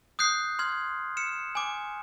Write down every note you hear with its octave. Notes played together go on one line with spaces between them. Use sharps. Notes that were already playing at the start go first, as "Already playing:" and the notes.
D#6 F#6 G6 C7
C6 F6 G#6
F6 C#7 E7
G#5 D6